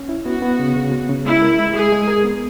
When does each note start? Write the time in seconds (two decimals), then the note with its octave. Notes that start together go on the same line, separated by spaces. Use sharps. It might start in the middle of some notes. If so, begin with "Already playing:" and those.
Already playing: C#4
0.09 E4
0.25 B3 F#4
0.42 B3
0.59 C#3
0.76 C#3
0.92 B3
1.09 C#3
1.25 G#3 E4
1.42 A#4
1.59 G#3
1.75 G#3 G#4
1.92 G#3
2.08 A#4
2.24 B3